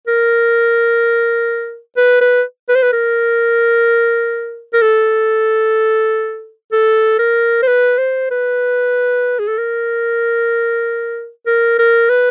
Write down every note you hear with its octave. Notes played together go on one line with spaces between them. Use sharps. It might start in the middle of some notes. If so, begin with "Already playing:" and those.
A#4
B4
B4
B4
C5
B4
A#4
A#4
A4
A4
A#4
C5
B4
C5
B4
G#4
A4
A#4
A#4
A#4
B4